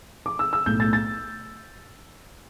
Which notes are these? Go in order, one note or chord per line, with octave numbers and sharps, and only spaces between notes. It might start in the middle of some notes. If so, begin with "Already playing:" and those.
D6
E6
E6
B1 A2 A3 G6
A6
A6